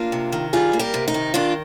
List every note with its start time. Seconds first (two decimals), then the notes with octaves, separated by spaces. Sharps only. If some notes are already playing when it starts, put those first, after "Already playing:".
Already playing: A#3 D4 F4
0.12 C3
0.32 D#3
0.53 G3 F4 G#4
0.73 A#3
0.79 G4 A#4
0.94 C3
1.08 D#4
1.14 D#3
1.34 D#3 D4 F4